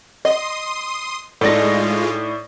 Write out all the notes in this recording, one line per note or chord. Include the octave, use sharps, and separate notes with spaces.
D#5 C6 D#6
A2 G#3 A3 D#4 F4 D5 A#6